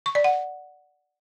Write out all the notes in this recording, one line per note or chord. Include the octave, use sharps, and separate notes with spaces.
C#6
D5
F#5